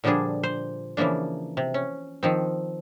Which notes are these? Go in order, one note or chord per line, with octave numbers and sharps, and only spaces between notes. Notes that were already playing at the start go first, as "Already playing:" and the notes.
A#2 D3 F3 G3 D4 G#4
C5
C#3 E3 F3 A#3 D4
C3
C#4
D#3 F3 C4